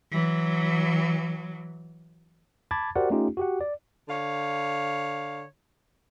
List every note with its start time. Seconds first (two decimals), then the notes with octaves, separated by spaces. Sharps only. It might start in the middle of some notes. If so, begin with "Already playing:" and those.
0.11 E3 F#3
2.71 A5 B5 D6 G#6 A6
2.95 F#4 G4 A#4 C5 D5 F#5
3.10 A3 C#4 D#4 F4 G4
3.37 F#4 G4 F#5
3.61 D5
4.08 D3 C#5 F5